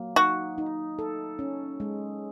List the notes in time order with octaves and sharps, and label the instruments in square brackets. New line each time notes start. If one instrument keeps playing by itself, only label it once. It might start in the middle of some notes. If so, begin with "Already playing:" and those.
Already playing: [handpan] F#3 A#3
[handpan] D#4 [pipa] F#4
[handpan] D#4
A4
C#4
G#3